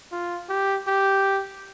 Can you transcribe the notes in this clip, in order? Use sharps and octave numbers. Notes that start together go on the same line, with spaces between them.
F4
G4
G4